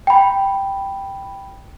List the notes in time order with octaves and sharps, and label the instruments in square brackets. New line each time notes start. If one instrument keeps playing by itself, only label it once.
[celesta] G5 B5